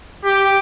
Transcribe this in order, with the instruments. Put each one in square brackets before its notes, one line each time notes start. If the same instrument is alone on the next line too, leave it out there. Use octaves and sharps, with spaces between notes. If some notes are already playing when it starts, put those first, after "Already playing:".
[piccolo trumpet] G4